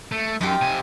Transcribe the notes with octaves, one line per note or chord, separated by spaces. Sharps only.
A3
F#2 D#4 F4 G4
C3 G#5